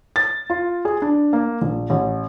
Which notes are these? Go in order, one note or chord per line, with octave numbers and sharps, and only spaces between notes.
A6
F4
G#4
D4
A#3
A#1
A1